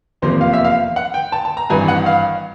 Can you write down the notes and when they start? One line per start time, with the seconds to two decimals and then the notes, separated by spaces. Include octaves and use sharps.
0.22 F1 E2 C3 F3 A#3 C5
0.41 F5
0.53 E5
0.65 F5
0.96 F#5
1.14 G5
1.32 A5
1.45 A5
1.57 A#5
1.70 G#1 G2 E3 G#5
1.88 F#5
2.06 F5